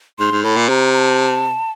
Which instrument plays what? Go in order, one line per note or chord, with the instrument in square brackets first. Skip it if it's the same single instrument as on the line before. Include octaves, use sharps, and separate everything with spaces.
[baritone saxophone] G#2 [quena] C6
[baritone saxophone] G#2
[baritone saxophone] A2 [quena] B5
[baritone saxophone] A#2
[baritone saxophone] C3 [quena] A#5
[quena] A#5
A5